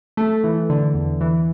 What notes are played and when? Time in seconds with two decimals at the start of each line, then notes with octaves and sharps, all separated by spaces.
0.17 A3
0.44 E3
0.69 D3
0.94 E2
1.21 E3